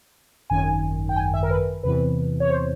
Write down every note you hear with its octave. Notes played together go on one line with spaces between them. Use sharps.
G#1 F#2 D#3 G#5
G5
G#5
E5
A#4
B4
E2 C3 E3 B4
C#5
C5